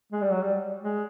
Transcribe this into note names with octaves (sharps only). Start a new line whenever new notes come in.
G#3
G3
F#3
G3
G#3